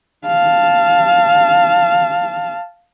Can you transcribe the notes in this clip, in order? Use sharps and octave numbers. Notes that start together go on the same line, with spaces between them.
F5 A5